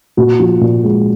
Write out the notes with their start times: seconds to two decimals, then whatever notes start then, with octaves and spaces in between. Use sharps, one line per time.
0.17 A#2 F#4
0.40 F3
0.61 A#2
0.83 G#3